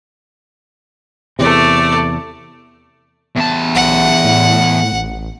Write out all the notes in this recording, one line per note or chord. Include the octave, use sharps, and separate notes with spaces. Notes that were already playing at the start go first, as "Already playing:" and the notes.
E2 C3 A3 D5
E2 A5
B1 F#5
A2
A1